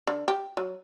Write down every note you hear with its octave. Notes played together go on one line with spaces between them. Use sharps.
D3
G4
F#3